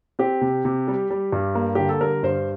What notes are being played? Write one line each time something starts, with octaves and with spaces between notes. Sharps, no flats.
C4 G4
C3
C3
G3
G3
G2
A#3
D3 G4
A4
G3 A#4
G2 C5